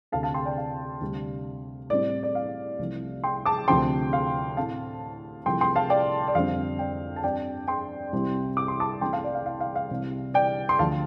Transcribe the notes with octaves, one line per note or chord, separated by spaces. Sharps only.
D2 C3 A3 F5 A5
F5 A5
G5 C6
D5 G5
F5
D2 C3 G3 C4
A2 G3 C4 D5
D5
F5
C2 C3 F3 A3
G5 C6
A5 D6
D2 C3 F3 C4 G5 C6
F5
A2 A3 C4 F5 A5
C2 C3 F3 A3 G5 C6
G5 C6
F5 A5
D5 G5
D5
F2 D3 G3 C4 F5
D5 G5
A5
G2 G3 C4 D5 G5
G5 C6
C2 C3 G3 C4
D6
C6
A5 D6
C2 C3 A3 C4 G5 C6
F5 A5
D5
F5
F5
F5
F5
C2 C3 G3
D5 G5
C6
D2 D3 F3 F5 A5